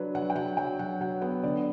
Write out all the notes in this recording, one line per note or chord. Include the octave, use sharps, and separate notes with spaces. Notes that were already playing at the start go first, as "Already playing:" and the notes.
Already playing: F#3 D4 B4
F#3 F#5
G5
F#3 F#5
F#3 G5
F#3 F#5
F#3 F#5
B3 F#5
D3 D5